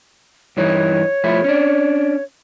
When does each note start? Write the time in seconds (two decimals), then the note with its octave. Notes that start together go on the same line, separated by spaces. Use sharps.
0.57 G2 E3 D#4 C#5
1.24 F3 A3 E4
1.44 C#4 D4